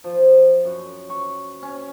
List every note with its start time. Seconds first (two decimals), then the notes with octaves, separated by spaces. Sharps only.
0.04 F3
0.65 F#2
1.09 C#6
1.63 C#4